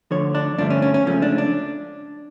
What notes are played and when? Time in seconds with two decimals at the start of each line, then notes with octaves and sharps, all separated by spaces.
0.11 D2 D3 F3 C#5
0.35 D4
0.58 G2 D3 F3 A3 D4
0.70 C#4
0.82 C#4
0.94 C#4
1.06 C#2 C#3 F3 A3 C#4
1.22 D4
1.38 D4